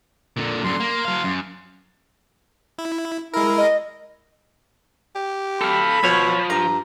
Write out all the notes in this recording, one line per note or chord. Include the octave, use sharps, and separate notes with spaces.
A#2 D3
F#2 D3 C6
A#3
F#3 F5
F#2
E4
G#3 E4 A#4
D#5
G4
A4 F5 B5
B2 F3 C#5
G2 A#5